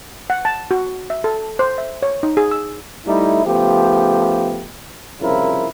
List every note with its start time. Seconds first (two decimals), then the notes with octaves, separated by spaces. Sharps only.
0.30 F#5
0.45 A5
0.71 F#4
1.10 E5
1.24 A4
1.59 C5
1.78 E5
2.03 C#5
2.23 D#4
2.37 G#4
2.51 E6
3.06 G3 A3 D#4 E4
3.45 C#3 F3 A3 B3 G4
5.21 C2 C#3 F3 E4 F4 A#4